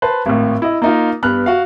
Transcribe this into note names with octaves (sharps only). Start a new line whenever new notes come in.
B4 C5 A5
G#1 A2
E4 D#5
A#3 D#4 F4
G2 B3 B5 F6 F#6
F#4 F5